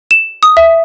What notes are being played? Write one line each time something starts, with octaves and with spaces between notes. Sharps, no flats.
E7
D#6
E5